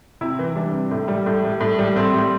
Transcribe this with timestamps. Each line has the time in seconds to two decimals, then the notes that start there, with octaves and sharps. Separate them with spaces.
0.21 C3 E4
0.39 E3
0.55 G3 D4
0.73 C3
0.91 A2
1.08 G3
1.26 A2
1.44 G3
1.60 A2
1.78 G3
1.96 A2 C4
2.14 G3